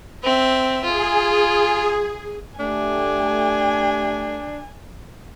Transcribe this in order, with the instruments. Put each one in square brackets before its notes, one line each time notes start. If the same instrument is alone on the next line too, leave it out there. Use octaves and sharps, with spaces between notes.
[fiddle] C4 E5
[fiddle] F4 [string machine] G#4
[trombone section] A3 G4 [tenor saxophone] D4 [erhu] G#5